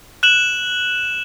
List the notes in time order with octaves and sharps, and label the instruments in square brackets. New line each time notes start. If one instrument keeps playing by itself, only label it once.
[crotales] F#6 E7 F#7